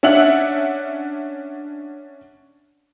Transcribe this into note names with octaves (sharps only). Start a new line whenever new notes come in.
C#4 D4 E5 F#5 F#7